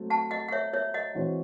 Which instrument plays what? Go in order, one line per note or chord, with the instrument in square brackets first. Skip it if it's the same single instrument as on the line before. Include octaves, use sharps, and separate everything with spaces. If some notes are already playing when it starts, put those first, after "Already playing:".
Already playing: [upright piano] F#3 A3 C4
[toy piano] F#5 A5
D#5 F#5
F#5
C#5 E5
C#5 E5
D#5 F#5
[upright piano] E3 G#3 C4 F#4 C#5